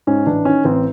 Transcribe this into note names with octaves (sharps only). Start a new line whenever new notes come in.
G#2 C#4
A1 D4
D#3 C#4
A1 C4